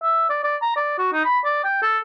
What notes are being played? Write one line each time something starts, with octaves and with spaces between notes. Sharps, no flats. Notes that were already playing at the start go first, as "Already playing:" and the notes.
E5
D5
D5
A#5
D5
F#4
D#4
B5
D5
G5
A4